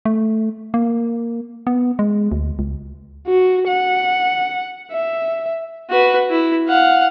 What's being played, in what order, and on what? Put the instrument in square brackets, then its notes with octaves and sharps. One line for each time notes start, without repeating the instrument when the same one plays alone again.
[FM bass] A3
A#3
B3
G#3
D2
C#2
[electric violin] F#4
F#5
E5
[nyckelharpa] F#4 B4
E4
F5 F#5